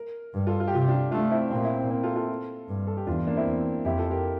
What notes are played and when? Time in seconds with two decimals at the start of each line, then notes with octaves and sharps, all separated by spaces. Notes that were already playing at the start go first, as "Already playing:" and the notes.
Already playing: A#4
0.34 G2
0.47 F4 A4
0.60 F4
0.67 G4
0.73 C3 F4
0.81 G4
0.88 D4 F4
1.11 A3 D4 F4
1.31 C4 E4
1.50 A#2 C4
1.64 C4 E4
1.78 C4
1.86 A#3
1.91 C4
2.03 F4 A4
2.16 F4 A4
2.68 G2
2.87 A4
2.97 G4
3.07 E2 D4 F4
3.27 A#3 D4
3.36 C4 E4
3.46 E2
3.85 F2 E4 G4
3.98 F4 A4
4.11 G4 A#4